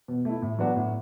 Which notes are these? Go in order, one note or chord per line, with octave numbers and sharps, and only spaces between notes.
B2
A3 E4
A2
F#3 B3 D4 F#4
A2